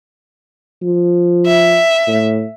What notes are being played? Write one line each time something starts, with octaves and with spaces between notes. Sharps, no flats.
F3
E5
A2